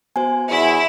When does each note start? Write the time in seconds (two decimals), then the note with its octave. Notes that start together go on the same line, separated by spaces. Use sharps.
0.16 B3 F#4 C5 G#5
0.50 E2 E4